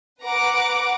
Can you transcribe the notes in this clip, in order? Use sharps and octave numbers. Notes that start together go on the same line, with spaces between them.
B4 F#5 A#5 D6